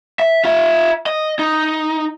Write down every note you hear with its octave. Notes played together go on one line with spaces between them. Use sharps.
E5
F4 E5
D#5
D#4